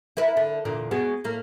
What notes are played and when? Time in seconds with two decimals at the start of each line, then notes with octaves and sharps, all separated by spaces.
0.17 E4 A#4 B4
0.37 D3
0.65 E2 A#2 D3
0.91 B2 G#3 B3
1.24 A2 A#3